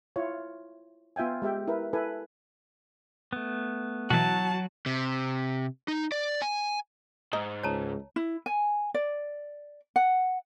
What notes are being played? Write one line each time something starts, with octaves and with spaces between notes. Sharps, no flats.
E4 F4 C#5
B3 F4 E5 G5 G#5
G#3 G4 E5 G5
E4 A#4 B4
E4 A4 B4 G#5
A3 B3
B2 E3 F#3 F#4 A5
C3
D#4
D5
G#5
G#2 D#4
C#2 C#5 A5 A#5
E4
G#5
D5
F#5